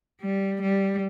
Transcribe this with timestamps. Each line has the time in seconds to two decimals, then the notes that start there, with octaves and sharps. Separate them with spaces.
0.21 G3
0.62 G3